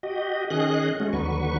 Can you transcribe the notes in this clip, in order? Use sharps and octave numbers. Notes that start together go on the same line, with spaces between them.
F#4 G4 D#5
D#3 C#4 G#4 D#5 F#6
G#3 A3 C#4 F#4
D#2 D3 F#3 B4 C#6